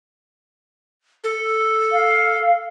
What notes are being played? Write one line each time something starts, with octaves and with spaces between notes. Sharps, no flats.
A4
F5